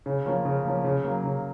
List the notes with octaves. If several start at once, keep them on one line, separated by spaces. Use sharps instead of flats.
C#3
F3 A#3 C#4
C#3
F3 A#3 C#4
C#3
F#3 A#3
C#3